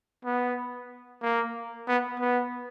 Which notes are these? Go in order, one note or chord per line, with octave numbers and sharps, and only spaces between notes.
B3
A#3
B3
B3